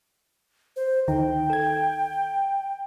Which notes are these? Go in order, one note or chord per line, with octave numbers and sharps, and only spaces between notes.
C5
D2 D#3 D#4 G5
A4 G#6